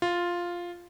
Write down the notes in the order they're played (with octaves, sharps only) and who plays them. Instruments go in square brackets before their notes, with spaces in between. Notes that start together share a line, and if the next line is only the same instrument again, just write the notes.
[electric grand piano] F4